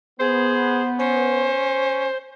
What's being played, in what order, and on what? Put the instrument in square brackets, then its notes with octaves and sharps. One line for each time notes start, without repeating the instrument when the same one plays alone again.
[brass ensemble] B3 [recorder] G#4 [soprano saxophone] C5
[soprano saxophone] C#4 [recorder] C5